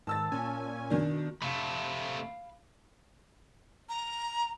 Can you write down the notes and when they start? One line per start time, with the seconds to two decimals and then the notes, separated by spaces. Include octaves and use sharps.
0.07 G#2 D#3 A5 E6 A6
0.32 A#2 C#4 G#5
0.90 B2 D#3 D4
1.42 C3 A3 F5 B5
3.89 A#5